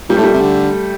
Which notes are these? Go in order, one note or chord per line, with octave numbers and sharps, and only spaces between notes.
A#2 G3
A2 A3
A#2 G3
C3
D3